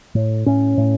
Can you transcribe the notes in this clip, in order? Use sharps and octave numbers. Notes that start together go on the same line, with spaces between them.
A2
A2 C#4
A2